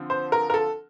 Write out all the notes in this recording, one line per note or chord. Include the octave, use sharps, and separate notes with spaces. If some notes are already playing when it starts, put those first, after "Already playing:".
Already playing: D3 F3 C4
C5
A#4
A#4
A4